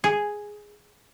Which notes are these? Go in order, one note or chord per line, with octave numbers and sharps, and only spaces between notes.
G#4